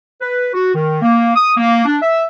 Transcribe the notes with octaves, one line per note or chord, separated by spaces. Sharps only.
B4
F#4
D#3
A#3
D#6
A#3
D4
E5